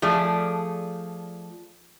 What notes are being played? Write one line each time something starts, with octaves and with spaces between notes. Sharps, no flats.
F3 A3 G#4 D5